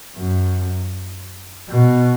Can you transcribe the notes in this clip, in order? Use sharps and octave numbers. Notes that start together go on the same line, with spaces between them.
F#2
B2